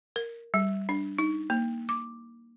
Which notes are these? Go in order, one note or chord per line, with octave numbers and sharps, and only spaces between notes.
A#4
G3
D4
D#4
A#3
D6